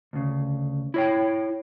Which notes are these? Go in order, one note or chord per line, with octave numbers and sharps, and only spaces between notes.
D2 C#3
E4 C#5 G5